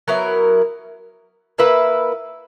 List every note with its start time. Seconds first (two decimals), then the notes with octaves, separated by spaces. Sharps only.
0.08 F#3 B3 E4 A#4
1.58 A#3 E4 B4 E5